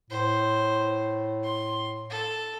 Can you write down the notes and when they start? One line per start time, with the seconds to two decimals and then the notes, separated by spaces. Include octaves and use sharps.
0.10 A2 C5
1.44 C6
2.10 A4